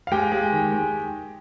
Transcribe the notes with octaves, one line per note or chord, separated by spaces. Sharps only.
F5
G#3 G4 G5
G#3
D#3
G#3